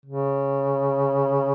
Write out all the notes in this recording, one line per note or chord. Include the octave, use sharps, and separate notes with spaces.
C#3